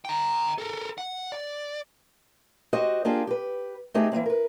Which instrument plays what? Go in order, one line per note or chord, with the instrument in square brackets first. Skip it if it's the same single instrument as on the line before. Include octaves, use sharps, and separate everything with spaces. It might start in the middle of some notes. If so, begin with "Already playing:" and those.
[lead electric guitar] G5 A#5
A4 A#4
F#5
D5
[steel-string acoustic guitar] F#4 G4 C5 D#5
A#3 D4 F4 G4 G#4 C5
G4 B4
A3 B3 C4 D#4 G4 G#4
E3 F3 A#3 C4
A#4 B4